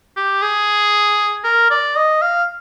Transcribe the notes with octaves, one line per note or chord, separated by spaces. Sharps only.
G4
G#4
A#4
D5
D#5
F5